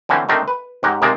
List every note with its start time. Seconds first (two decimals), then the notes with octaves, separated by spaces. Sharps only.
0.09 D3 E3 C4 C#4
0.29 D#3 A3 C4 D4 D#4
0.48 B4
0.83 G#2 C#4 G4 F#5 A#5
1.02 D#2 C3 G#3 A#3 C4 D5